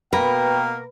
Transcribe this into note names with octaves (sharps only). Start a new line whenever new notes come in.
B2 A#3 A#4 B4 G5